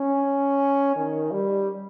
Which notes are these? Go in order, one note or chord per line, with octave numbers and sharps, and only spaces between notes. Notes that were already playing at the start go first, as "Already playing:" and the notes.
Already playing: C#4
D#3
G3